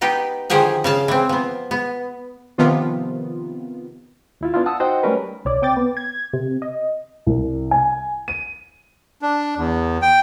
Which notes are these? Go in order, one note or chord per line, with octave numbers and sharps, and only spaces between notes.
B3 D#4 G4 B4
D3 D#3 F3 G4 G#4 F#5
C#3 F5 A5
E3 C4
F3 B3
B3
C3 D#3 F3 B3 F4
D#2 E4 F4
B3 D4 E4 F4
F#5 A5 D#6 E6
D#4 F#4 C5 D#5 F#5 G5
G3 A3 C#4 A#4 B4
C2 C#5 D5
C4 G5 D6 A6
B3
G#6
C3
D#5
C2
G#5
D#7
D4
E2
G5